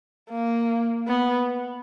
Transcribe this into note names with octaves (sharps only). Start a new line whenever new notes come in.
A#3
B3